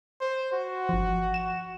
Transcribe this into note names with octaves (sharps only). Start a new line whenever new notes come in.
C5
F#4
G1 F3
E7